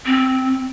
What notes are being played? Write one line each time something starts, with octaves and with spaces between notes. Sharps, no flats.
C4